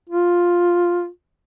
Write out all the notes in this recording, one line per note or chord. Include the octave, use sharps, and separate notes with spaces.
F4